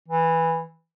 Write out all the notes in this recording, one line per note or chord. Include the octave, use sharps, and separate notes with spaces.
E3